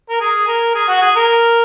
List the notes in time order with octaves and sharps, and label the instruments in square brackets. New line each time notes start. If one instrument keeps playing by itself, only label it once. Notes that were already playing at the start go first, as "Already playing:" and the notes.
[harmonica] A#4
G#4
A#4
G#4
F#4
G#4
A#4